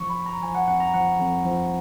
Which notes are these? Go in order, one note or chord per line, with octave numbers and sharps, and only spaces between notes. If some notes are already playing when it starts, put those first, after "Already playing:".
Already playing: F3 C#6
B5
F2
A#5
F3 G#5
F#5
F2 F#5
A#5
F3 F#5
F2
F3